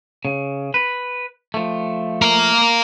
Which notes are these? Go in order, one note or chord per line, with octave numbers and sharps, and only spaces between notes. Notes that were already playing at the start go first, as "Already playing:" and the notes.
C#3
B4
F3 A3
A#4 F5